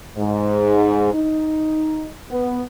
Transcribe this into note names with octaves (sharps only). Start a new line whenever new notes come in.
G#2
D#4
B3